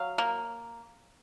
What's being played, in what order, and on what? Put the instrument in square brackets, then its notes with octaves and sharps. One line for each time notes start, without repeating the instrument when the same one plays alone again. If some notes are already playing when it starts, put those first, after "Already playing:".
Already playing: [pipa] F#3 [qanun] F5
[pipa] A#3